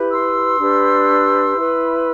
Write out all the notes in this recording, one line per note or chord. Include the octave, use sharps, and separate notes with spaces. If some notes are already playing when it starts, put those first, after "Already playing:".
Already playing: E4 G4 B4
C6 E6
D4 G4 B4
E4 B4